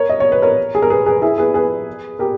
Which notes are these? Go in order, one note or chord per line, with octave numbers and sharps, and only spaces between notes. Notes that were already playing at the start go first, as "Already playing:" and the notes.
Already playing: A#4 C#5
D#5
C#5
B4
A#4 C#5
G#4
A#4
G#4 B4
G#4 B4
E4 G#4
G#4 B4
G#4 B4
G4 A#4